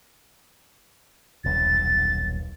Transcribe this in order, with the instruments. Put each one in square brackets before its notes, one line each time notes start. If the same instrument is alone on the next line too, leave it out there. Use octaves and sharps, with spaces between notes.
[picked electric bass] D#1 B1 [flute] A6